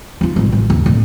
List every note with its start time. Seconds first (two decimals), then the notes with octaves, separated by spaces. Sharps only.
0.21 D#4 F4
0.36 C2 G#2
0.53 A1
0.70 D#2
0.86 D1